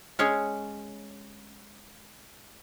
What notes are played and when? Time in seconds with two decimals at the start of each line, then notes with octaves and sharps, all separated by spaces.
0.19 G#3 C#4 G#4 C#5